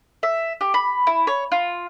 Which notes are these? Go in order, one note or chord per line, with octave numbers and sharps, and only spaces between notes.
E5
G4
B5
E4
C#5
F4